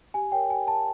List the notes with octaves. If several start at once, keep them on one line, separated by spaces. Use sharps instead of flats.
G4 G#5
A#4 C#5 G5
G4 G#5
A#4 C#5 A5